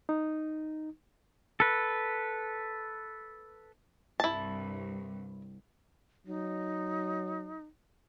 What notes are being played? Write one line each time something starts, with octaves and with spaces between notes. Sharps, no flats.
D#4
A4 B4
C2 G2 E4 A5
F#3 D#4